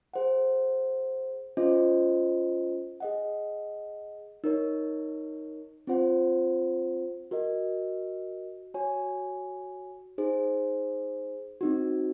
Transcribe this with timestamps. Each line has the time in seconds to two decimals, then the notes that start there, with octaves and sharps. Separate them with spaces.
0.14 G#4 C5 F#5
1.57 C#4 F4 C5 D#5
3.00 G#4 D#5 F#5
4.44 D#4 A#4 C#5
5.87 C4 F4 C5 F#5
7.31 F#4 A#4 D#5
8.74 F#4 C#5 G#5
10.18 D#4 G#4 C5
11.61 C4 D#4 F#4